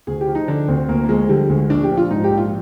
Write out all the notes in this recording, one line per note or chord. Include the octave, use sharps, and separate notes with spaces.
D2 G#4
G4
F3
D#4
D3 D4
D2 C4
D2 A#3
A#3
F3 G#3
D3 G3
D2 G#3
A#1 D4
G4
F3
F4
G#2 D#4
G4
A#1
F4